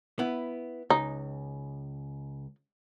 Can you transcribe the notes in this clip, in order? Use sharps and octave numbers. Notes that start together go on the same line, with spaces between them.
B3 E4
C#2 D#4